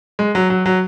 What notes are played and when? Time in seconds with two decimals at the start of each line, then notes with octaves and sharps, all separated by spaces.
0.19 G#3
0.35 F#3
0.50 F#3
0.66 F#3